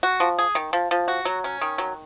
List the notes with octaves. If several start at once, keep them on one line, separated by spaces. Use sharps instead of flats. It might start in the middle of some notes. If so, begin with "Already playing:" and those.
F#4
F3
G#4
D#3
F3
F3
F#4
F#3
C#4
D#3
F#3